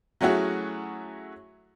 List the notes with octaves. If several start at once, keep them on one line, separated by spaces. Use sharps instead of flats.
F#3 A3 C#4 E4 F#4 G#4